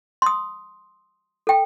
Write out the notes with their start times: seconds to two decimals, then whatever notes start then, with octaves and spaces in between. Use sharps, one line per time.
0.22 C6 D#6
1.47 A4 G5